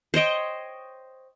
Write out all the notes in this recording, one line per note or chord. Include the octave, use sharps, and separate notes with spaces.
C5 C#5 D#5 G5